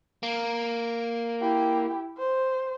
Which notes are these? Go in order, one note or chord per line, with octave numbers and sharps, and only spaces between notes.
A#3
E4 G4
C5